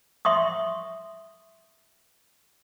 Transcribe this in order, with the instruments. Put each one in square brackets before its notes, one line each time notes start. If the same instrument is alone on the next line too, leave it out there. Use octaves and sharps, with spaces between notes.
[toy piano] E5 C6 C#6 D#6